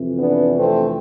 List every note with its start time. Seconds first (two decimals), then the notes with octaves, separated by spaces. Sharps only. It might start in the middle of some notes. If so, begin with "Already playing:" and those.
Already playing: F2 C3 E3
0.19 B3 D4
0.57 A3 C4